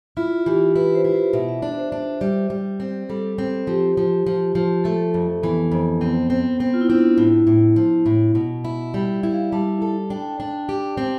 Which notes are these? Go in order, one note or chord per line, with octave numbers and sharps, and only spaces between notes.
E4 F4
E3 G4
E4 B4
C5
E4
C5
B2 E5
E5
D4 D5
C5
D4
G3
G3
C4
G3 A4
C4
F3 G4
F3
F3
F3
A3 A4
F2
E3 B3
F2
B3 C4
C4
B3 C4
F4
E4
C4 D4
A2 E4
A2
F3
A2
B2
E4
G3
E4
F5
G3 A5
A4 A5
D4 G5
D4
G4
C4